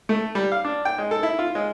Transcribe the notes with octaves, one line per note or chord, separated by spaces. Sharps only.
A3
G3
F5
D4
G5
G#3
A4
E4
F4
G#3